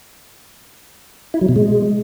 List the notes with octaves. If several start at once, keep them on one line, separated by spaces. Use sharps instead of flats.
E4
F#3
B2
G#3